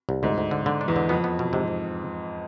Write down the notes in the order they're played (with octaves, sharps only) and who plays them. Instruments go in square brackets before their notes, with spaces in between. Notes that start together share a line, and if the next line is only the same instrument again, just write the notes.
[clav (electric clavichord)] C2
[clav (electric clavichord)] D2 [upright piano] G#2
[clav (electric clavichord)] D2
D3
D3
D4
[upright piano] E2
[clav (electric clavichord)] D3
[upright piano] F2 [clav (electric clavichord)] B3
[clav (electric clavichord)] B3
B2
[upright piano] G#2 [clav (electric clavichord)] C3
[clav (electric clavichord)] C3